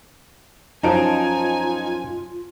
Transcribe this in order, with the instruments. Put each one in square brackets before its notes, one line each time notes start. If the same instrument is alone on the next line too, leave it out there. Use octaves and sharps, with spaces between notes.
[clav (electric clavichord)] F#2 F3 [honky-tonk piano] D#4 A5 D7 [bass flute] F4 [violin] G#5